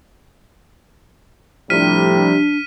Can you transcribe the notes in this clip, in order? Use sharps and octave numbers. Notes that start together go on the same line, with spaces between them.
A2 C3 F3 G3 D4 F6 B6 D#7